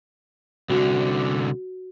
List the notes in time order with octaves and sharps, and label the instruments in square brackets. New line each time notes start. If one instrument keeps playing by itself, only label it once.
[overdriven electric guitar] C2 D3 [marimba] F#4